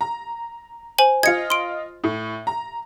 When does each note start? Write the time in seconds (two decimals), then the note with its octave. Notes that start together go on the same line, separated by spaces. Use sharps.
0.01 A#5
0.98 C5 G#5 F#7
1.23 F4 D#5 G#6 C#7
1.50 C6 D7
2.04 A2
2.47 A#5